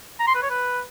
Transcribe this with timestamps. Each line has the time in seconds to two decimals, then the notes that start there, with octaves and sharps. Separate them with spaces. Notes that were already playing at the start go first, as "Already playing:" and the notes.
0.20 A#5
0.27 C6
0.35 B4
0.43 C#5
0.50 B4